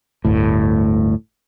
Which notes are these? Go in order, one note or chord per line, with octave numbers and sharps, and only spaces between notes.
G1 D2 A2